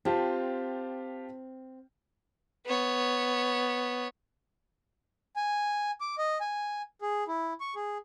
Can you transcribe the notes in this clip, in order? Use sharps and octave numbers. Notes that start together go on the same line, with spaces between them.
C4 F4 G4 A5
B3 C#5
G#5
D6
D#5
G#5
G#4
E4
C#6
G#4